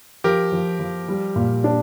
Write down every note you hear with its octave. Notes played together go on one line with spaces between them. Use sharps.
F3 G4 A#4
F3
F3
G3
A#2
D4